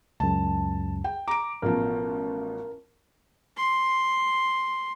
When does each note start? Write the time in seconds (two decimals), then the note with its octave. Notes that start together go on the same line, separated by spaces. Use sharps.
0.20 C#2 F#2 A5
1.04 G5
1.28 A#5 D6 D7
1.62 A1 B2 F3 A#4
3.57 C6